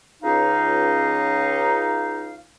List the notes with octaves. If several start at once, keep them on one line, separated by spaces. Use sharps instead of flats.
C#2 D#4 F5